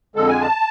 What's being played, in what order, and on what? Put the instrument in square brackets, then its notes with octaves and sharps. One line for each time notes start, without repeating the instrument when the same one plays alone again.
[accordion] F2 D3 G#3 A4
G#5
A5